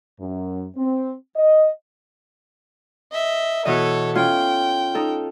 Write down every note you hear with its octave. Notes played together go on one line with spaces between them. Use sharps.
F#2
C4
D#5
D#5 E5
B2 E3 A4 C#5 D#5
C#4 F4 G5
D#4 A4